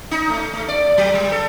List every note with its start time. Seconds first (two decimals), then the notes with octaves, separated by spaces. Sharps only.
0.11 D#4
0.30 A3
0.53 A3
0.68 D5
0.98 F#3
1.14 G3
1.32 A4